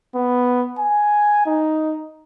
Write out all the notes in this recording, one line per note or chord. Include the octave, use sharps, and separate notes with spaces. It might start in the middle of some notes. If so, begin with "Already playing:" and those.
B3
G#5
D#4